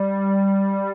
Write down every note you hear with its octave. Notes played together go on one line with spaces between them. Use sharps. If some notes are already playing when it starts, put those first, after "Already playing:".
Already playing: G3